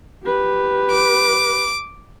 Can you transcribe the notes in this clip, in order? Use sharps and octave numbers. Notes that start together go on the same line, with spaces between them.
G4 B4
D6